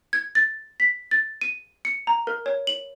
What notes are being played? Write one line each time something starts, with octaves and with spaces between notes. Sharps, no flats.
G#6
A6
B6
A6
D#7
C#7
A#5
A#4
C#5
F#7